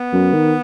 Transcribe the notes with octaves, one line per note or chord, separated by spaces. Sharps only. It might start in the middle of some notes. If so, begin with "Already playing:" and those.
Already playing: B3
F#2
D#3